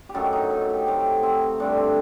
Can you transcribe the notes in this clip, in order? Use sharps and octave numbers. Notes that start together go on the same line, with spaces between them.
G4
F#2 D#3 A3 F#4
D#4
D#4
G4
C3 F#3 A3 G4
C4
G2 D3 A3 D4
C4